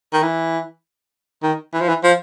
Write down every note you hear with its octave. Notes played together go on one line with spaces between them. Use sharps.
D#3
E3
D#3
E3
F3
E3
F3